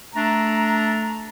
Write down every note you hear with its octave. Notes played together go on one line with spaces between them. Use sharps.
A3 D4 A4 A#5